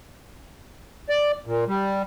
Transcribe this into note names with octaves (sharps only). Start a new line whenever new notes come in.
D5
A#2
G3